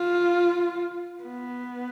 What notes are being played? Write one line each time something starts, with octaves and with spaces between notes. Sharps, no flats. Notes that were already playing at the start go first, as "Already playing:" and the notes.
Already playing: F4
B3